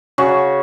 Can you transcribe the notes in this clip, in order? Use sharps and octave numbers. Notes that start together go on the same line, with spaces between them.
C#3 F#4